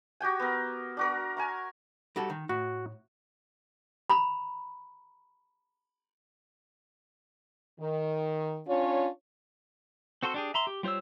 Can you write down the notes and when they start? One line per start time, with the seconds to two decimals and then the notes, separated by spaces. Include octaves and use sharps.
0.20 F#4 G4 G5 G#5
0.40 B3 A#4
0.97 D4 F#4 A#4
1.37 G#5 A#5 C#6
2.16 G3 F#4 A4
2.30 D#3
2.49 A2 F#4
4.10 A#5 B5
7.80 D#3
8.68 C#4 D4 F4 C#5
10.23 C4 F#4 A4 C5
10.34 D4 G4 G#4
10.54 E5 A#5 C6
10.67 G4
10.83 G3 F4 C5 C#5 E6